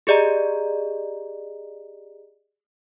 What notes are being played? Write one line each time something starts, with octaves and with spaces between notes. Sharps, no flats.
G4 G#4 D5 D#5 A#5